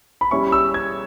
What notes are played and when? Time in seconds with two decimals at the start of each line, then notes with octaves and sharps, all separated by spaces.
0.21 B5
0.31 G3 C#4 E4 C#6
0.52 E6
0.74 G#6